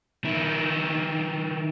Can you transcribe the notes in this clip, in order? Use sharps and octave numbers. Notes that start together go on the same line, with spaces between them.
D#3 E4